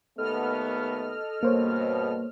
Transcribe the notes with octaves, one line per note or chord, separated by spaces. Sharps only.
D#2 A3 B3 A4 D#5 F6
G2 B2 A#3 C5 C#5